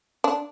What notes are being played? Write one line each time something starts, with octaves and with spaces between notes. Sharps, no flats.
D4